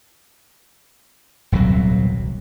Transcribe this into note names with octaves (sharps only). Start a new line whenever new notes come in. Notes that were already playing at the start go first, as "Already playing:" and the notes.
D#1 C2 B2 F#3